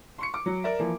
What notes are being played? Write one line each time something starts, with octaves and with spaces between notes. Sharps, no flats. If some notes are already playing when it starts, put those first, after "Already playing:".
C6 C#6 C#7
D6
F#3
A#4 D5 E5
E3 F3 A#3